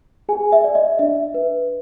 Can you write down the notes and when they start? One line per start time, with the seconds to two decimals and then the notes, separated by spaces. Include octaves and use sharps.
0.29 G#4 G#5
0.52 E5
0.64 D5
0.75 D#5
0.99 D4 E5
1.34 B4